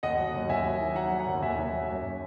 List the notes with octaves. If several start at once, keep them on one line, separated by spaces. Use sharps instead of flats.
D#2 D#5 F#5
F#3
D#2
D#2 E5 G#5
F#3
D#3
F#3 F#5 A#5
F#3
F#5 A#5
D#2
D#2 E5 G#5
D#2
F#3
F#2